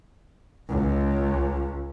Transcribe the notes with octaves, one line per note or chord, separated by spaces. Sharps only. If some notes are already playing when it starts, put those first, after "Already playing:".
C#2